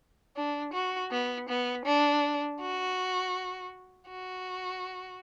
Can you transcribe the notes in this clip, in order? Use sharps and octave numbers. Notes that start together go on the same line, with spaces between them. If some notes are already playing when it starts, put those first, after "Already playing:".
D4
F#4
B3
B3
D4
F#4
F#4